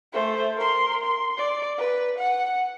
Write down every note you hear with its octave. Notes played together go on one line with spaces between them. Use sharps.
A3 C5
A#4 C6
C6
D5
B4
F#5